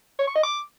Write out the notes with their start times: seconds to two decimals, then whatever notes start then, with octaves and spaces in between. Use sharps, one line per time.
0.19 C#5
0.27 C#6
0.35 D#5
0.43 D6